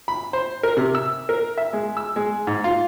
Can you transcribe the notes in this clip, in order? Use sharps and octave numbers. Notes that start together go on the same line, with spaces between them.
B5
C5
A#4
C3
E6
A#4
E5
G#3
E6
G#3
G#2
F4